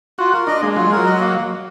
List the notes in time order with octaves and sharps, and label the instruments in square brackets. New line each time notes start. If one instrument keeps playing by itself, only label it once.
[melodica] F4 [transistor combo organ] F#4
[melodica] A#4
[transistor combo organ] D4 [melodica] D#5
[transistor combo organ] G#3 [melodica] A#3
[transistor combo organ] F#3 [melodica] F4
[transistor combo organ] G#3
[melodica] A#4
[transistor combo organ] F#3
[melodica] D#5
A#3